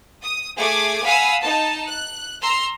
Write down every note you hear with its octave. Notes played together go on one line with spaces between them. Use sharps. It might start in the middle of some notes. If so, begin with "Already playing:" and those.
D#6
A3 G#4 D6 G#6
F5 F#5 G#5 B5 D#6 E6
D#4 A5
F#6
A#5 C6 E6